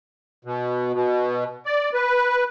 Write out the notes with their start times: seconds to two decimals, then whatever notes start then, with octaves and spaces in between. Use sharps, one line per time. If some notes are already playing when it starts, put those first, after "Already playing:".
0.45 B2
0.94 B2
1.66 D5
1.94 B4